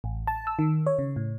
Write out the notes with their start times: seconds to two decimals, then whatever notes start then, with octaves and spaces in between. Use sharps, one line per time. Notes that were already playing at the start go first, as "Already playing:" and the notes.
0.04 A1
0.27 A5
0.47 E6
0.59 D#3
0.87 C#5
0.99 C#3
1.16 A2